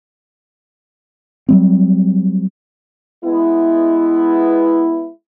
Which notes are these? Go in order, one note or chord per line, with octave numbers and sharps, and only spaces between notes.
F#3 G3 C4
G#3 B3 E4